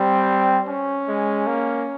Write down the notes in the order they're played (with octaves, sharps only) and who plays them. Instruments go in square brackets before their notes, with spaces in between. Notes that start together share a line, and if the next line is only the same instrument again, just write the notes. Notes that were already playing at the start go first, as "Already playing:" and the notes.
Already playing: [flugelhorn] G3 [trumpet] C4
[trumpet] C#4
[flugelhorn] G#3
A#3